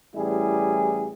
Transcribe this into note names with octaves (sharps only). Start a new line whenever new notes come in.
A1 G3 E4 G#4